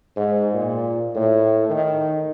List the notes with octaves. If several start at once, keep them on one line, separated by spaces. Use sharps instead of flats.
G#2
A#2
A2
D#3